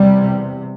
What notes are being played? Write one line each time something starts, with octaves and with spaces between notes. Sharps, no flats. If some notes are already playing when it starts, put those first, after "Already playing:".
Already playing: E2 C3 G3